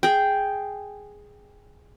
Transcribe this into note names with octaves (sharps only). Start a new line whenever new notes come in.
G#4 G5